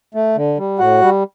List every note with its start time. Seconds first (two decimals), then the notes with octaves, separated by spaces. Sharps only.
0.15 A3
0.36 D3
0.58 G3
0.79 A2 F#4 F#5
1.02 G3